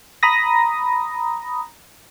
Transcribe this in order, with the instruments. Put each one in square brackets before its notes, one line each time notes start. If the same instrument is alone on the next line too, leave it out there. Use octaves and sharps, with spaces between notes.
[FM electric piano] A#5 B5 D#6 A#6